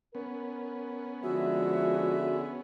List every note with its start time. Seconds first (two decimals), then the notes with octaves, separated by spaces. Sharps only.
0.15 B3 C#4 A#4
1.23 D3 F3 G#3 F#4 G#4 E5